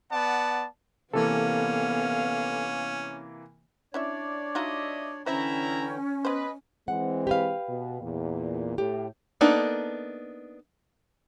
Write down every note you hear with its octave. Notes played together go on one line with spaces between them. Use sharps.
B3 D5 F#5 A5
C3 E3 A#3 B3 C#4 A4 F5
C#4 D4 E4 C#5 D5 E5
D#4 F4 F#4 D#5 E5
D3 E3 C#4 E4 C5 E5 G5 A#5
B3 B4 C5 D#5
E3 G#3 C4 F#5
G4 B4 F5
B2
E2 A#2
A2 G4
A#3 B3 D4 D#4 A4